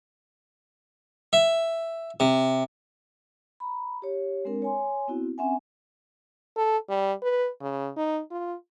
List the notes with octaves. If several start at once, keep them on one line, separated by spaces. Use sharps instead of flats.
E5
C3
A#5 B5
G4 C#5
G#3 C4 D4 A#4
C#5 G#5 C6
B3 C4 E4 F#4
C4 C#4 E5 F#5 G#5
A4
G3
B4
C#3
D#4
F4